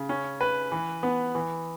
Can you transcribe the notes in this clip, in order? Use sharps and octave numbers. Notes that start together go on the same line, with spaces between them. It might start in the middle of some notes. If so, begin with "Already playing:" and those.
Already playing: C#3
C#4
B4
E3
B3
E3